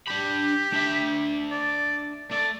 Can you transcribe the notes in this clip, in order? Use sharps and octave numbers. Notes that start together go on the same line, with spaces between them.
D4 G4 B5
D4 E5
D5
A3 D5